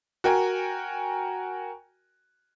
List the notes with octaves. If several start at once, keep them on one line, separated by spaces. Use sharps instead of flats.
F#4 A#4 G5 G#5